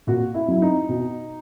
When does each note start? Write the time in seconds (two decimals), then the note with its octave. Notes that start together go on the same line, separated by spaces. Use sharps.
0.07 A#2 F#4
0.34 E4
0.48 F#3 E4
0.62 D#4
0.89 B2